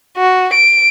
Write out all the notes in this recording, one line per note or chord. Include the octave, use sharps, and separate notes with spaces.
F#4
D7